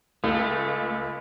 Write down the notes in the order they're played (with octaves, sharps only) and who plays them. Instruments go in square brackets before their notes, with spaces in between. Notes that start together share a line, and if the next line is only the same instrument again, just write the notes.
[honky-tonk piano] C#2 [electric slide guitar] A3